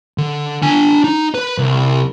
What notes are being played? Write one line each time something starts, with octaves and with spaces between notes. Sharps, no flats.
D3
D4 G#5
D#4
B4
C2